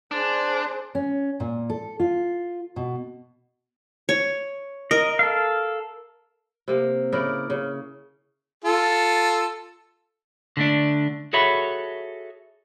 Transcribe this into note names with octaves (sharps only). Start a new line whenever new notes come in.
D4 G#4 C5
C#4
A#2
A4
F4
B2
C#5
A#4 D#5
A4 F5
C3 A#3
C#3 E4 A#4 D5
C#3
F4 A4
D3 A3 D4
F#4 G#4 A4 C#5 E5 B5